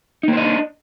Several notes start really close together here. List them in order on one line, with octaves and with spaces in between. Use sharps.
D#4 A#3 C5 D#5 D4